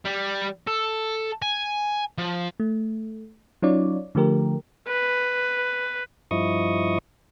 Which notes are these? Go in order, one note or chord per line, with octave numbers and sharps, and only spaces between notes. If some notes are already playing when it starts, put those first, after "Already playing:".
G3
A4
G#5
F3
A3
F#3 C#4 D#4 F4 C#5 D5
D3 F3 A3 G4 A#4
B4
G2 F3 E4 D#5 C#6 D#6